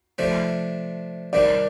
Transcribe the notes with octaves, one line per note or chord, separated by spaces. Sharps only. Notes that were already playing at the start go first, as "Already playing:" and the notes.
C3 F3 A3 D4
C3 D#3 G3 D4 D5